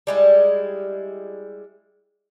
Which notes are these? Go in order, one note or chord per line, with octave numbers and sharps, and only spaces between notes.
G3 G#3 E4